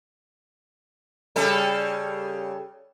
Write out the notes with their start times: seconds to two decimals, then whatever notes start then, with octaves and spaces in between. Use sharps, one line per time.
1.36 C#3 G3 A4